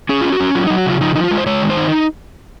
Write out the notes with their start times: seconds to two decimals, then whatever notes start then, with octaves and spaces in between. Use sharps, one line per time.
0.09 C#4 G#4
0.21 C#4 F4
0.32 F#4
0.40 C#4
0.55 F#3 F4
0.67 D#4
0.70 F#3
0.78 F#4
0.86 C#3 F4
1.01 F3 D#4
1.15 F3 D#4
1.24 F4
1.31 G#3
1.38 C5
1.46 G#3 C#5
1.62 D#3
1.70 C5
1.77 D#4